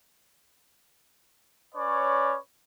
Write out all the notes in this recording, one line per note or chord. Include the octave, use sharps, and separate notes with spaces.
C#4 B4 C#5 D5